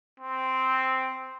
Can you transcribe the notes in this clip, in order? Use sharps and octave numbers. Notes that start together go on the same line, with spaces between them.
C4